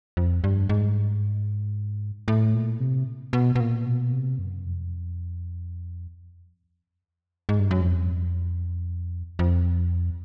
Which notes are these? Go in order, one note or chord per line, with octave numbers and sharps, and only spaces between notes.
F2
G2
G#2
A2
A#2
C3
B2
B2
A#2
B2
C3
F#2
F2
G#2
G2
F#2
F2
F2